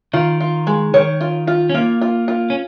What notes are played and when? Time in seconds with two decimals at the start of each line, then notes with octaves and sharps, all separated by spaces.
0.13 D#3 F4
0.40 F4
0.67 G#3
0.94 D#3 C#5
1.21 F4
1.47 F4
1.70 C#4
1.74 A#3 F4
2.01 F4
2.28 F4
2.50 C#4